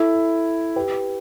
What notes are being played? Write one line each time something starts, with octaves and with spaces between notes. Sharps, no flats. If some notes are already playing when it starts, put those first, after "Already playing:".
Already playing: E4 A4
G4 B4